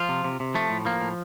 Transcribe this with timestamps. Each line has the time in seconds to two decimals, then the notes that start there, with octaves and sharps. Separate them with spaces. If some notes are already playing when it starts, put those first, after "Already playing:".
Already playing: F3 F4
0.09 C3
0.24 C3
0.40 C3
0.55 F3 A3
0.70 A2
0.85 F3 A#3
1.01 A2